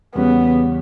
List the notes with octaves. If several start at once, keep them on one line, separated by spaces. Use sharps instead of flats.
E2 C#3 G3 B3 C#4